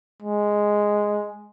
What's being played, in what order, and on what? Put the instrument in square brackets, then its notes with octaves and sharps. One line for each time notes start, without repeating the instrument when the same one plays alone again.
[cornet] G#3